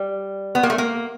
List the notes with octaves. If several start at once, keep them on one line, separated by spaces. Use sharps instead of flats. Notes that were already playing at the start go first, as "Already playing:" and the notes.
Already playing: G3
B3
A#3
A3
A#3